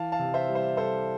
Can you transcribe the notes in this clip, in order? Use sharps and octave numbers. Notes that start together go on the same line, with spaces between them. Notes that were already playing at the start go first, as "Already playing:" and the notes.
Already playing: E3 F5 A5
F5 A5
C3
C5 E5
G3
C5 E5
G3 A4 C5